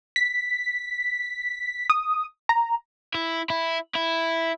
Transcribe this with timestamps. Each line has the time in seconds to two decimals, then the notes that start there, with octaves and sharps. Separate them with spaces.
0.16 B6
1.90 D#6
2.49 A#5
3.15 E4
3.50 E4
3.95 E4